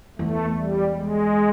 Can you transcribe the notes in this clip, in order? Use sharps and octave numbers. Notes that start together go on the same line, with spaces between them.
E2 A3
G3
G#3